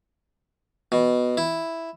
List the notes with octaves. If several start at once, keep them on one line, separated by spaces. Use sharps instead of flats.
B2
E4